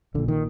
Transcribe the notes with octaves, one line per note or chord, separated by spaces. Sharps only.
A#1 A#2 D3
D#3